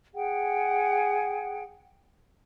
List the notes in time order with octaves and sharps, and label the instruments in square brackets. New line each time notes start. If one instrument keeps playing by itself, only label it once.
[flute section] G#4 F#5 G5